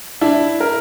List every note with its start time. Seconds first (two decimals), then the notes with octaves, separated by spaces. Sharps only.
0.21 D4 E4
0.60 A#4